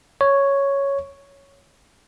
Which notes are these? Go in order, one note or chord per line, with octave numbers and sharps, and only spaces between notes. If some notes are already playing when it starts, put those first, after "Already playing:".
C#5